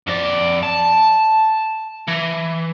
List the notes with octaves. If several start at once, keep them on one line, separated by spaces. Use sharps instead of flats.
F2 D5
A5
E3